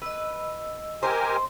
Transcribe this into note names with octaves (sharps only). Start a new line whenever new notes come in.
B4 D#5 E6
G4 A#4 C5 G#5